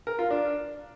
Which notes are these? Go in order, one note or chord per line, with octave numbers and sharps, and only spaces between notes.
A#4
F4
D4